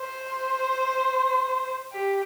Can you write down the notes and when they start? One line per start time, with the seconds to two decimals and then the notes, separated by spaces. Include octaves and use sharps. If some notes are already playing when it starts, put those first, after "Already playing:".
Already playing: C5
1.93 G4